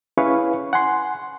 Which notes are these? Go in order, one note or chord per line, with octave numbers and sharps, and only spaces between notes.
C#4 E4 G#4 B4 F5 C#6
F#5 G#5 C6